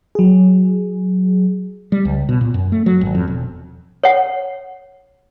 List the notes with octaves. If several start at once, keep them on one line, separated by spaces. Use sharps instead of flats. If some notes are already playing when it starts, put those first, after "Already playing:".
F#3 G#4
G3
C#2
B2
A#2
F#2
A3
F#3
G#1
F2
E1
C#5 F#5